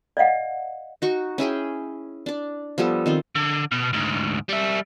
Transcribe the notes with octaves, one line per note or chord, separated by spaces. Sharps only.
D5 D#5 F5 F#5
D#4 F#4 C#6
C#4 E4 G#4 G5
D4 D5
F3 G3 B3 A4
D#3 C4 F4
D3
B2
D2 G#2
G3 E5